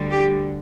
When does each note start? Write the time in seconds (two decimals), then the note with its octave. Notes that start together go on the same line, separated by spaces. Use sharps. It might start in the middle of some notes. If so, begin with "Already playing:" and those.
Already playing: D2 D3 G3
0.10 G4